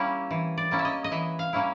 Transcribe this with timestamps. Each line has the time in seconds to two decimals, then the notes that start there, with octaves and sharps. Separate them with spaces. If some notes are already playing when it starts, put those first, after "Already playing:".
Already playing: G3 A#3 C#4 E4
0.31 E3
0.58 D5
0.71 G3 A#3 C#4 E4
0.79 E5
0.85 D#5
1.04 D#5
1.11 E3 E5
1.39 F5
1.53 G3 A#3 C#4 E4